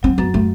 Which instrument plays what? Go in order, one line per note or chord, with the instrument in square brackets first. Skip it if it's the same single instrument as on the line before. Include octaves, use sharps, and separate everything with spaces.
[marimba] F#3 [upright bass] C4
[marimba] F#2 [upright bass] B3
[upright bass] A3